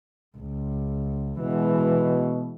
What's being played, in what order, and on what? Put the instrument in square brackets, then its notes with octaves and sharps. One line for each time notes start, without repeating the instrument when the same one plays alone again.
[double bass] C#2
[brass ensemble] B2 [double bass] E3 G#3